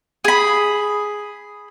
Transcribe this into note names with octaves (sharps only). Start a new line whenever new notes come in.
G#4 B5